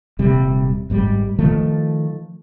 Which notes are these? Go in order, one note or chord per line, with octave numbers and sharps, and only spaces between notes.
D#1 C3 G3
G#1 G#2 G3
D#3 F3 A3